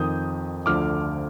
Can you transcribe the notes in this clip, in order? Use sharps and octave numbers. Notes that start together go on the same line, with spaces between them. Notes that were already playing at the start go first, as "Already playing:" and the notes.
Already playing: F2 D#3 D#6 G6
D2 D3 F3 D6 F6